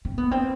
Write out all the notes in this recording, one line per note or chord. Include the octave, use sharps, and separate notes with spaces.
C4
B3
C4